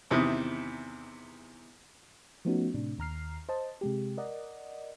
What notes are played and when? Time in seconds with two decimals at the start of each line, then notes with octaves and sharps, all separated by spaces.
0.11 E2 C3 D#3 E4 D#6
2.45 F3 A3 B3 C#4 D#4 F#4
2.74 A2 C3 D4
2.98 D#2 A#5 F6 C7
3.49 C5 D#5 A5
3.81 C3 G#3 G4
4.17 A#4 D5 D#5 F#5